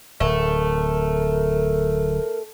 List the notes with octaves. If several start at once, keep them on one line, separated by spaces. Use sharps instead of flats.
D1 A3 A#4